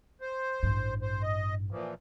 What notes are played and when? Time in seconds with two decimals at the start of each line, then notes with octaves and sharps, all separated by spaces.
0.21 C5
0.63 A1 G2
1.02 C5
1.22 D#5
1.71 A#2 E3 F3